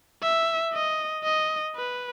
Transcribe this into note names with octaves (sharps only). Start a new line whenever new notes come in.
E5
D#5
D#5
B4